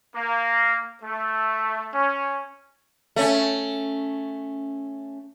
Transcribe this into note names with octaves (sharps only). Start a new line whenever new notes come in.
A#3
A3
C#4
A3 C#4